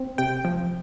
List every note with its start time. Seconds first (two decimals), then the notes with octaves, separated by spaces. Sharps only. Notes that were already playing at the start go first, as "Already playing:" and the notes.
Already playing: C4
0.18 C3 G5
0.45 F3